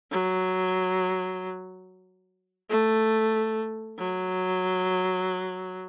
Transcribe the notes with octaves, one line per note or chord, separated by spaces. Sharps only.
F#3
A3
F#3